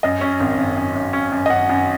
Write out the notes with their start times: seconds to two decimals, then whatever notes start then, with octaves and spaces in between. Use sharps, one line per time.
0.03 F#2 D#5
0.21 C#4
0.40 G#1
0.58 G#1
0.76 F#2
0.95 F#2
1.13 C#4
1.32 F#2
1.46 D#5
1.50 F#2 F#5
1.69 F#2